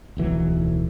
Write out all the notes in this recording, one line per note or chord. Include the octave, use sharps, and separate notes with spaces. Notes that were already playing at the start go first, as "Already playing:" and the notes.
D1 B1 E3 F#3